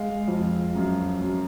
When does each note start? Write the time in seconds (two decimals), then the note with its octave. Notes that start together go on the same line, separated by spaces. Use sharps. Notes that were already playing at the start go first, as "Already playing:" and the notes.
Already playing: G#3 F5
0.28 F2
0.75 F#2
1.21 F#2